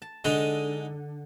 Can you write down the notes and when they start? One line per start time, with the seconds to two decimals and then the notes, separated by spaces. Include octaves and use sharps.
0.02 A5
0.25 D3 G#3 D#4